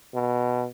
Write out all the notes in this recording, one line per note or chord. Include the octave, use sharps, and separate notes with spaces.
B2